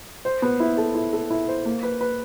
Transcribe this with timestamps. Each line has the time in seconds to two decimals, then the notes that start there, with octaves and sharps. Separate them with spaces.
0.25 C5
0.42 B3
0.60 E4
0.77 A4
0.95 E4
1.13 A4
1.30 E4
1.48 C5
1.65 A#3
1.83 B4
2.01 B4